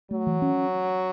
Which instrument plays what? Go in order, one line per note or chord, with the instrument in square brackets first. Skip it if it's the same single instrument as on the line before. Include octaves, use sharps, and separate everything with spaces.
[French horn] F#3 [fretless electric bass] A3
[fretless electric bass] E3
C#4